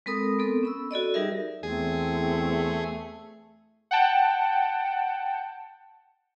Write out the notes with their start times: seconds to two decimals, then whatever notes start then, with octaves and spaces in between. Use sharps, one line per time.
0.06 G#3 C4 A4 A#4 B5 D#6
0.39 B3 C4 A4
0.63 C#4 B5 E6
0.91 F#4 A4 D5 D#5
1.14 G3 D#4 G4 G#4 A#4 E5
1.63 E2 A3 C4 G#4
3.91 F#5 G5 A5